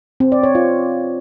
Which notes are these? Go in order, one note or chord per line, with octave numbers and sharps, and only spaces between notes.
C4
D5
C#5
F4